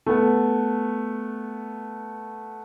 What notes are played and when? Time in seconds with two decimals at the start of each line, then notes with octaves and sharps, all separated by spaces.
0.06 A3 B3